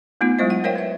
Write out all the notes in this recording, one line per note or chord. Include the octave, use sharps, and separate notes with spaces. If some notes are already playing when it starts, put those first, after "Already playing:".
A3 B3 D#4 F4
F#3 G#3 E4 C5 D#5
F#5
A#4 C5 C#5 D#5 F5 G5
B4 E5